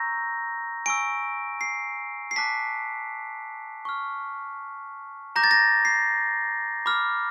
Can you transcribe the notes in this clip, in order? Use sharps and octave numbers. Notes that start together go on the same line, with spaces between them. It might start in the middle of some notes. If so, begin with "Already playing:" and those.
Already playing: A#5 C#6 E6 G6 A#6
G#5 C#6 E6 D7
C7
C7
A5 D6 F#6 B6
C#6 F6
A#5 D6 G6 A#6
A6
A#6
C7
B5 D6 F6